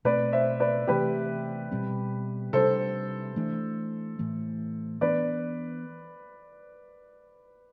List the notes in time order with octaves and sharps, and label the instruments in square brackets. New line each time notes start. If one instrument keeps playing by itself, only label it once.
[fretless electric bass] B2 A3 C4 [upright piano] B4 D5
[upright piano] C5 E5
B4 D5
[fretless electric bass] C3 E3 A3 C4 [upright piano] G4 B4
[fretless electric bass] B2 G3 C4
[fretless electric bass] C3 G3 D4 [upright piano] A4 C5
[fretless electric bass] E3 A3 D4
A2 E3 A3
[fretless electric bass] E3 B3 D4 [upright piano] B4 D5